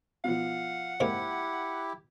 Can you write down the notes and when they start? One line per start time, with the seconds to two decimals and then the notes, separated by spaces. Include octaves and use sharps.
0.24 B2 F3 F5 F#5
1.00 G#2 C3 A#3 E4 G4